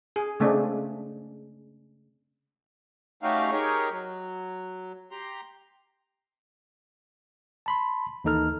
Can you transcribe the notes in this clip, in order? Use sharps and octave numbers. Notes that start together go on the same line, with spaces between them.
G#4
C#3 G#3 A3 C4 D4
A3 C#4 D#4 F#4 G4 F5
D#4 G4 G#4 A#4 C#5
F#3
G4 A#5 C6
A5 B5 C6
D#2 E3 D#4 A4 F6